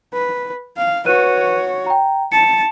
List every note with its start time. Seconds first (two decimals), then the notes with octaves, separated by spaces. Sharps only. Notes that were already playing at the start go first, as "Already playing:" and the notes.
0.13 B4
0.77 F5
1.06 F#4 B4 C#5 F#6 D#7
1.86 G5 A#5
2.32 A5 C#7